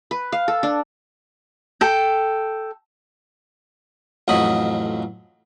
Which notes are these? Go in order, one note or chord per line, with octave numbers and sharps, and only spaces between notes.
B4
F5
A4
D4
A4 G5
A1 F2 F#3 D#5 B5